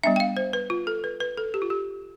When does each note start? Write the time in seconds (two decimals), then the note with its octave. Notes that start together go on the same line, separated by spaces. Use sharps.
0.04 G3 B3 D4 E5
0.16 G5
0.20 F5
0.37 C5
0.53 B4
0.70 F4
0.87 A4
1.04 B4
1.20 B4
1.37 A4
1.54 G4
1.62 F4
1.70 G4